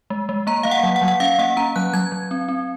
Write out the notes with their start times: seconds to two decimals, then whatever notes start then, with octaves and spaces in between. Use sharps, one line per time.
0.10 G#3
0.29 G#3
0.47 A#3 A#5
0.63 A#3 F5
0.71 F#5
0.83 F#3
0.96 F#5
1.02 F#3
1.08 F#5
1.20 C#4 F5
1.39 A#3 F#5
1.57 C#4 A#5
1.76 F#3 F#6
1.93 F#3 G#6
2.12 F#3
2.31 C4
2.48 C4